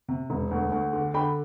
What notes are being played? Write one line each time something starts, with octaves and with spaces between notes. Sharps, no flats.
C3
E1
D2
D2
D3
D3 G5 B5